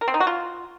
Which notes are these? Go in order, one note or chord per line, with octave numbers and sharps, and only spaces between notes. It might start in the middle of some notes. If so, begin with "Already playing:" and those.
A#4
C4
D#4
F#4
F4